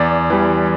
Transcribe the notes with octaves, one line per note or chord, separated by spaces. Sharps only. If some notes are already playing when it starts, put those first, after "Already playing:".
Already playing: E2 D5
E3 G3